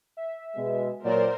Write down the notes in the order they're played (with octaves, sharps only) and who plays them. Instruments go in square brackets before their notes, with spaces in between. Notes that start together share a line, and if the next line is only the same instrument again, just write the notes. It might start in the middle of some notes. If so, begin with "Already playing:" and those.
[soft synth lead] E5
[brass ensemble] B2 G#3
[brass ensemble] A#2 F#3 [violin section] A#4 C5 [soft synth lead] D5